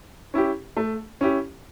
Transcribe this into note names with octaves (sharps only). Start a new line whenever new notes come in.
C#4 E4 G4
A3
C#4 E4 G4